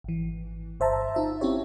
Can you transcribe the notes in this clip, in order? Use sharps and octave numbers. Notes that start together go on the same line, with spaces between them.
G#1 E3
G1 C5 E5 A5 A#5
D#4 F4 E5
C4 C#4 E4 G4 C#5